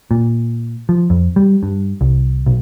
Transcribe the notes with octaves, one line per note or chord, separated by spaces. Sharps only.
A#2
F3
F2
G3
G2
C2
B1